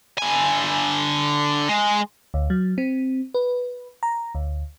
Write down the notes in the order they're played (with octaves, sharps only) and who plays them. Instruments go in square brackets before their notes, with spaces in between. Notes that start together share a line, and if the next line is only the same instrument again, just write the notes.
[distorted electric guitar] D3 G#5
G#3
[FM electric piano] D2
F#3
C4
B4
A#5
D2